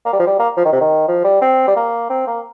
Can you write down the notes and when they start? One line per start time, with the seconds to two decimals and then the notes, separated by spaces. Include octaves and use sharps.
0.05 A#3
0.13 G3
0.19 F3
0.27 G3
0.39 A#3
0.57 F3
0.65 D#3
0.73 C3
0.81 D#3
1.08 F3
1.24 G3
1.41 C4
1.67 G3
1.76 A#3
2.10 C4
2.27 A#3